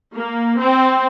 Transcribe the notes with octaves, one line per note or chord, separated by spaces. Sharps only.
A#3
C4